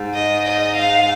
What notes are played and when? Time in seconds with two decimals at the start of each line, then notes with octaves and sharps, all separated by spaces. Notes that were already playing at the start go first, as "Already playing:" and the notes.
Already playing: G#2
0.14 D#5
0.46 D#5
0.77 F5